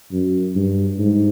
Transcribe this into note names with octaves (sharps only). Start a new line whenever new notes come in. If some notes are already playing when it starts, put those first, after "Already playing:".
F#2
G2
G#2